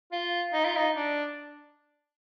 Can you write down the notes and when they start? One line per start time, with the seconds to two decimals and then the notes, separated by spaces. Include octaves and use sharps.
0.12 F4
0.53 D#4
0.65 F4
0.77 D#4
0.95 D4